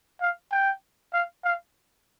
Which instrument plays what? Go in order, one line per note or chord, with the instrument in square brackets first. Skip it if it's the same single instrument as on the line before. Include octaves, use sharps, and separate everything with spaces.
[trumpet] F5
G5
F5
F5